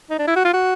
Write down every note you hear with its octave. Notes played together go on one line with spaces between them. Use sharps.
D#4
D4
E4
F#4
F4
F#4